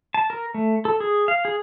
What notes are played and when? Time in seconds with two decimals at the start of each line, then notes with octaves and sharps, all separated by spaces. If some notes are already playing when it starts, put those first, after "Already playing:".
0.14 A5
0.30 A#4
0.54 A3
0.85 A4
1.00 G#4
1.28 F5
1.45 G#4